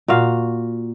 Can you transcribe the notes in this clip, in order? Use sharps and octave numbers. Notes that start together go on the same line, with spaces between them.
A#2 F#4 F5